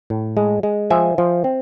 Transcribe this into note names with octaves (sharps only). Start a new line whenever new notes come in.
A2
G#3
G#3
F3 E5 G#5
F3
C4